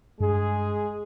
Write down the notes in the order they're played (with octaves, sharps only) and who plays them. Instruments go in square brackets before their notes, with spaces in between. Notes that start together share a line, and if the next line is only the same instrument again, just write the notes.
[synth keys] G2 [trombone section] G#3 G#4